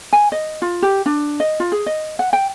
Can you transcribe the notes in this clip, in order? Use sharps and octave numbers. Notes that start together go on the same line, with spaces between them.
G#5
D#5
F4
G4
D4
D#5
F4
G#4
D#5
F#5
G5